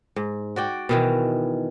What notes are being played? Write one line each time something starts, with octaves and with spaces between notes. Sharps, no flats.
G#2
F#4 D5 G5
B2 D#3 E3